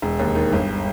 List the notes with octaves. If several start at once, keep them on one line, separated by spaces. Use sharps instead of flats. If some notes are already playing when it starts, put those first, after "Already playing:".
E1
D#2
D#3
G1